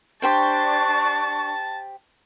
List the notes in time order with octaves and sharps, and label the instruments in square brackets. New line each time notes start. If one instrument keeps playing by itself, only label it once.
[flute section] D4 C#6 [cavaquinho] G4 C5 G5 [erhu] A5